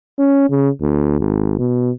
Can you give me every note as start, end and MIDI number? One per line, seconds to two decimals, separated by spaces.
0.19 0.49 61
0.50 0.69 49
0.81 1.16 38
1.20 1.58 32
1.59 1.91 47